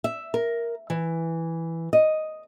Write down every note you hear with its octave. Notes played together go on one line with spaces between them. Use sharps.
E5
A#4
E3
D#5